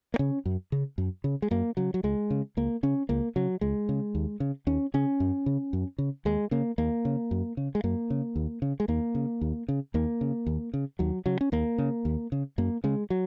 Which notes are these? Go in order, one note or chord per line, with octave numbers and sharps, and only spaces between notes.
A#3
C#3 C#4
F#2
C#3
F#2
C#3
G#3
F#2 A#3
C#3 F#3
F#3
C#2 G#3
C#3
C#2 A#3
C#3 C#4
C#2 A#3
C#3 F#3
C#2 G#3
C#3
D#2
C#3
D#2 C#4
C#3 C#4
F#2
C#3
F#2
C#3
D#2 G#3
C#3 A#3
D#2 A#3
C#3
F#2
C#3
G#3
F#2 A#3
C#3
D#2
C#3
G#3
D#2 A#3
C#3
D#2
C#3
D#2 A#3
C#3
D#2
C#3
D#2 F#3
C#3 F#3
C#4
D#2 A#3
C#3
D#2
C#3
F#2 A#3
C#3 G#3
F#3